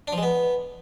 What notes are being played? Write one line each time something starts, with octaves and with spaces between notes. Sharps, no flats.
D4
F3
G#3
B3